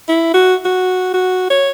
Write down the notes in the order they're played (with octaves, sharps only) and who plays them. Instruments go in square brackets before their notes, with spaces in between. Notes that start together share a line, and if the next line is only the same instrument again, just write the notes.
[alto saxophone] E4
F#4
F#4
F#4
C#5